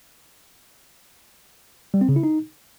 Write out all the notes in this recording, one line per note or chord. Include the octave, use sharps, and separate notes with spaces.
G3
C4
C#3
E4
D#4